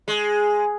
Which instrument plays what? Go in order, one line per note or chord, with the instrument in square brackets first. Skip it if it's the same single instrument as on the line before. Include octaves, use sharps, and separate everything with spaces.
[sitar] G#3